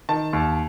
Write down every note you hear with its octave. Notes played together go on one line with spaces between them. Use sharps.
D#3 A5
D#2